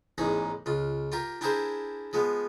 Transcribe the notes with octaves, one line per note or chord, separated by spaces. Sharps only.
A1 E2 G#2 D#4 G#4
C#2 F4
F4 G4 A#4
D4 E4 G4 G#4 A#4 C5
F3 G#3 B3